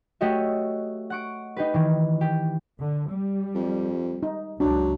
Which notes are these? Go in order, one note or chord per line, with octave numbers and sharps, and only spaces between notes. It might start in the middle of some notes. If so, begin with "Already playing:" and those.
A3 F#4 G4 C#5 D#5 E5
F#5 C#6 D7
D#4 G4 B4
D#3 E3
G4
D3
G3
F2
D#4
C#2 F#2 F#3 D4